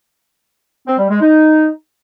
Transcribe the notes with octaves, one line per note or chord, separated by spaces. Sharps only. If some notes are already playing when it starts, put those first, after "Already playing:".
C4
G3
G#3
D#4